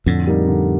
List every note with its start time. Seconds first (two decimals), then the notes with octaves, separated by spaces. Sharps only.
0.06 F2 A2 D3
0.27 G3 A#3 D#4
0.48 D3